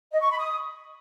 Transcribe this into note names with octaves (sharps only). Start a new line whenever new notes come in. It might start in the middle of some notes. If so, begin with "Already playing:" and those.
D#5
C#6
B5
D#6